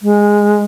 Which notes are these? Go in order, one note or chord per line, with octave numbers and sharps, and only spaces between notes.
G#3